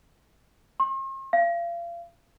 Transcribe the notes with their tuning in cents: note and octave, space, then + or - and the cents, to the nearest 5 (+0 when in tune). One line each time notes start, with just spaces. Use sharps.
C6 +45
F5 -35